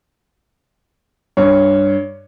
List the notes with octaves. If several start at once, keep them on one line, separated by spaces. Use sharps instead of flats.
G2 C#5